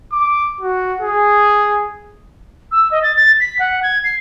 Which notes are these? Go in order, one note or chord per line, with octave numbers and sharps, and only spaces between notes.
D6
F#4
G#4
E6
D#5
A6
A6
B6
F#5
G#6
C7